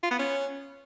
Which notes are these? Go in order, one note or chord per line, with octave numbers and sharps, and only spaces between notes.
F4
B3
C#4